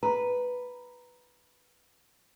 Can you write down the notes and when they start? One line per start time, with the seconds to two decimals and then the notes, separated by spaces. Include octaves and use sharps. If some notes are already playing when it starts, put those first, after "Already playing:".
0.03 B4 A#5 B5